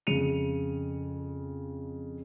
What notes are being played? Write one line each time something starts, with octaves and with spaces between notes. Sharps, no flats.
F2 C#3 C#7 D#7 F7